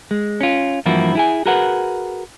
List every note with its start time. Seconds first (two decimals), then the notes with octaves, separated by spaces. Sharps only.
0.11 G#3
0.41 C#4 F4
0.86 G2 E3 F3 A#3 E4 F#4
1.15 E4 G#4 G#5
1.46 F#4 G#4 A#4 B4 F#5